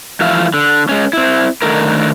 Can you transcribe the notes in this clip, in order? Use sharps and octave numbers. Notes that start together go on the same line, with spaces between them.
E3 F3 A3 E5 F5
D3
G#3 C#4
C4 E4
D3 D#3 A3 E4 A#4